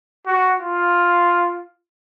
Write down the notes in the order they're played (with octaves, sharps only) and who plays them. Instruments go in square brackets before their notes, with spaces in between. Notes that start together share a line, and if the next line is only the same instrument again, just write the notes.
[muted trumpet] F#4
F4